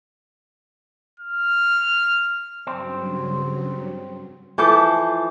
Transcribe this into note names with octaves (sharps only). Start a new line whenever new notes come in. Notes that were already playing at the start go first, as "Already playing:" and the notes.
F6
G2 C#3 F#3 C4
E3 F3 A4 A5 D6 G6